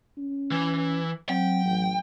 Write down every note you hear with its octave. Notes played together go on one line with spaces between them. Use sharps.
C#4
E3
F#3 C4 G5
A1